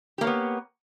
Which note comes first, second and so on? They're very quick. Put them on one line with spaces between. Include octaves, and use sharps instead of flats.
G4 A#3 C#5 B3